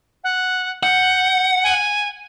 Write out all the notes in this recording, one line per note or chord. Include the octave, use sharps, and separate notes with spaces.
F#5
F#5 G6
G#5